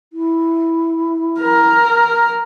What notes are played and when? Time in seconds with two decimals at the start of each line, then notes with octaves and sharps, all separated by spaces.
0.13 E4
1.40 A#4